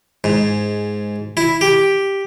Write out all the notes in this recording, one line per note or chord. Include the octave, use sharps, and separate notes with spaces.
G#2
E4
G4